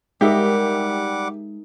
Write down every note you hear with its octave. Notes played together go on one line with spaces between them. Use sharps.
G3 G#3 D#4 G4 A#4 E5 F#5 D6